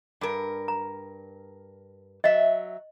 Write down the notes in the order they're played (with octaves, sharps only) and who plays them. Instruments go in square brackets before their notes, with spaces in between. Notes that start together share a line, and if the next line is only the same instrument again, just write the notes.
[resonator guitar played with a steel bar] G2 A#4
[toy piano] A#5
[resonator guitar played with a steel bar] F#3 E5 [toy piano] D#5